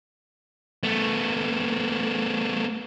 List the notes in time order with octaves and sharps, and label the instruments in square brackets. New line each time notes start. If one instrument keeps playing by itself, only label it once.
[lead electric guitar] A3 B3